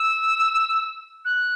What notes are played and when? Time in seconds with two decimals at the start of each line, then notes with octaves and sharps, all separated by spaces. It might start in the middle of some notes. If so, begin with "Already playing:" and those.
Already playing: E6
1.25 F#6